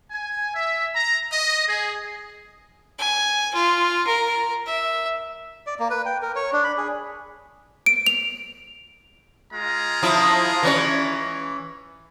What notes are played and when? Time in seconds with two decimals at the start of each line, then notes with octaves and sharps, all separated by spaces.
0.11 G#5
0.55 E5
0.95 A#5
1.32 D#5
1.67 G#4
2.99 G#5
3.55 F4
4.07 A#4
4.67 E5
5.67 D5
5.79 A#3
5.90 B4
6.06 G5
6.22 A#4
6.36 C#5
6.53 D4
6.64 B5
6.77 G#4
7.86 D7
8.07 F7
9.53 G#3 F4 A#5
10.03 F3 E4
10.63 E3 C#4 C#5